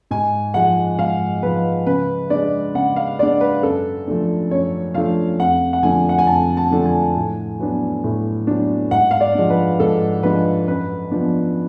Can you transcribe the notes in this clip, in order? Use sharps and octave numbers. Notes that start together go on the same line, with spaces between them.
G#2 G#5
F3 G#3 F#5
G#2 F5
F3 G#3 B4
C#3 B4
G#3 D4 D5
C#3 F#5
F5
G#3 D4 D5
B4
F#2 A4
F3 A3 D4
F#2 C#5
F3 A3 D4 F5
F2 F#5
F#5
D3 F3 A3 D4 G#5
F#5
G#5
F2 A5
A5
D3 F3 A3 D4
G#5
A2
F#3 B3 D4
A2
F#3 B3 D4
G#2 F#5
F5
D5
F3 G#3 D4
B4
G#2 A4
F3 G#3 D4 B4
F#2 B4
F3 B3 D4